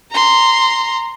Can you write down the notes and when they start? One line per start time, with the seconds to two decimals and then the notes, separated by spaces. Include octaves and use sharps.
0.11 A#5 C6